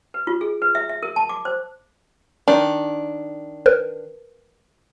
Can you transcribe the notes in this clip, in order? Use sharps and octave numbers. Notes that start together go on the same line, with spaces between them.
B4
F4
G#4
B4
E5
E5
A#4
A5
D6
C5
D#3 D4
A#4 B4